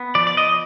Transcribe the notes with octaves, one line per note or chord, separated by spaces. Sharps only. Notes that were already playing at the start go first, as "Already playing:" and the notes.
Already playing: B3
F3 D5
D5
D#5